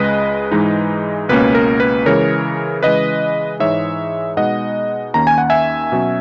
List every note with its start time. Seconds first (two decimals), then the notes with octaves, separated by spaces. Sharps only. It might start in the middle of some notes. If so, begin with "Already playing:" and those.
Already playing: C#2 C#3 G#3 B4 D#5
0.51 G#2 E3 G#3 D#4
1.29 C#2 B2 A#3 C#4 B4
1.55 A#4
1.80 B4
2.06 C#3 E3 G#3 A#4 C#5
2.83 C#3 E3 G#3 B4 D#5
3.60 G#2 E3 G#3 D#4 C#5 E5
4.37 B2 G#3 B3 D#4 D#5 F#5
5.14 D#2 D#3 A#3 C#4 A#5
5.27 G#5
5.38 F#5
5.50 E5 G#5
5.92 B2 F#3 C#4